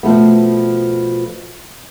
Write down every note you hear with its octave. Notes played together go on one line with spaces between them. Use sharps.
B2 F3 A3 B3